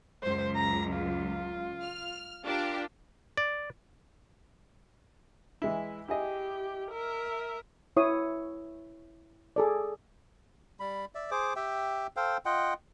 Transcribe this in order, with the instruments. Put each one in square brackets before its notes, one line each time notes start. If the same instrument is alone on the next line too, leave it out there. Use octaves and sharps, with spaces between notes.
[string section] C#2 F#2 [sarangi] C5
[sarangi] A#5
F4
[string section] F6
[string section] D4 G4 A#4 [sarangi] F4
[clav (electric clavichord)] D5
[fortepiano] E3 G#3 E4
[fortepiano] E4 G#4 D#5 [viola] G4
[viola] A#4 E5
[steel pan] E4 C#5 D#6
G#4 A4 D5
[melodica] G3 B5
D5 E5
G#4 C5 D6
G4 E5 G5
A4 C5 F5 G5
F4 D#5 F#5 G5